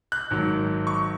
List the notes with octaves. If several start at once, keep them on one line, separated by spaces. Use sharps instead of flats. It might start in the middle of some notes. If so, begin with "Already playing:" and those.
F#6
G#1 G#2 D#3 F#3
C#6